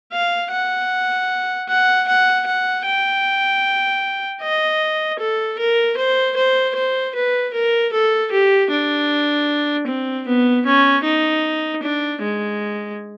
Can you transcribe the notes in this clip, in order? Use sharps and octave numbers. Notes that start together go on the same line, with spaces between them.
F5
F#5
F#5
F#5
F#5
G5
D#5
A4
A#4
C5
C5
C5
B4
A#4
A4
G4
D4
C4
B3
C#4
D#4
D4
G#3